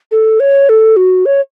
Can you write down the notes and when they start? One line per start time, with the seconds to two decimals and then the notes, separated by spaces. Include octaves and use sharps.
0.11 A4
0.40 C#5
0.69 A4
0.96 F#4
1.26 C#5